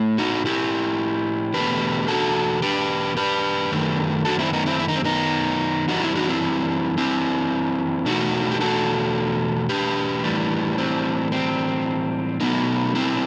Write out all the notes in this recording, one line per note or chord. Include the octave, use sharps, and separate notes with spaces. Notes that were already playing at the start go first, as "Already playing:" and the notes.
Already playing: A2 A3
D#4 F#4
E4 G4
E2 B2 A3 G4 B4
F#4 A4
G4 B4
G4 B4
F#2 D#3 A3
F#4 A4
C4 E4
B3 D#4
C4 E4
E4
D#4
C4
B3 D#4
F#2 E3 G3 D#4 F#4
C4 E4
D#4 F#4
C4 E4
C4 E4
E2 B2 A3 D#4 F#4
G4
F#4 A4
G4 B4
A2 E3 G3
C4
C4
B2 F#3 A3 B3 D#4
C4 E4